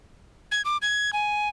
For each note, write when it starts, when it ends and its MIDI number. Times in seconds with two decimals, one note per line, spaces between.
0.51 0.62 92
0.65 0.77 86
0.82 1.11 92
1.13 1.49 80